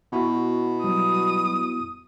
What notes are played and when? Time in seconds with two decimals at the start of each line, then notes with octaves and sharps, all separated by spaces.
0.12 B2 B3 E4 F#4
0.84 F#3 G3 D#6